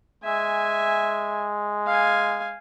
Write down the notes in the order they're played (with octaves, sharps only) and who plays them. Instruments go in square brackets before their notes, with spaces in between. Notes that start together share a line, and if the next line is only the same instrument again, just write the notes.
[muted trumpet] G#3 [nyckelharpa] E5 G#5
[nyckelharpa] F5 G#5